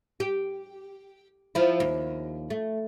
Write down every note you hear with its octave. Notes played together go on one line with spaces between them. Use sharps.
G4
F3 E4
D#2
A3